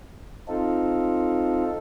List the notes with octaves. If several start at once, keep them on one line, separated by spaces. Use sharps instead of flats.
C4 D#4 F4 A4